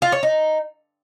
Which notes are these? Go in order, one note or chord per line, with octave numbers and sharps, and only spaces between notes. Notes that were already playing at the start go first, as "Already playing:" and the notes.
F4
C#5
D#4